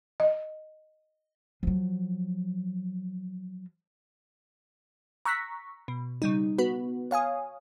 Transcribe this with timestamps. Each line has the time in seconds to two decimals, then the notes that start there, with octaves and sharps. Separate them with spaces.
0.20 D#5
1.63 F3 F#3
5.25 A#5 C#6 E6 F#6 A#6 B6
5.88 B2
6.22 C#3 G3 D#4
6.58 B3 F#4 B4
7.11 C#5 F5 G#5 D#6